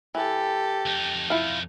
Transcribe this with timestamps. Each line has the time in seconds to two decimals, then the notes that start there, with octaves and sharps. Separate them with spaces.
0.15 E3 G4 A4
0.86 F2 D#4
1.30 E4 F4 F5